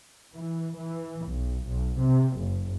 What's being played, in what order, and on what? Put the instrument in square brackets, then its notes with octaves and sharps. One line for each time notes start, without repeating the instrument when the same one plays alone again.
[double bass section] E3
E3
B1
B1
C3
F#1